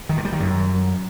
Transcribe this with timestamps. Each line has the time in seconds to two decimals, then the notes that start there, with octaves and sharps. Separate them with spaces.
0.09 D#3
0.17 G2
0.25 G3
0.32 D#3
0.40 F#2